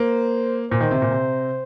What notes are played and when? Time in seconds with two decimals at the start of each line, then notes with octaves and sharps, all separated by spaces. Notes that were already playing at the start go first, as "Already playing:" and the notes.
Already playing: A#3 C5
0.71 A#2 C5
0.81 D#3
0.91 C3
1.02 A#2
1.11 C3